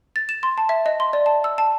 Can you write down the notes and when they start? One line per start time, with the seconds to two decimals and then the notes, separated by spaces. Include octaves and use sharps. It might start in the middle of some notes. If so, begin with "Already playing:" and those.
0.16 A6
0.29 E7
0.43 C6
0.58 A5
0.69 E5
0.86 D#5
1.00 C6
1.13 D5
1.26 A5
1.44 E6
1.58 A5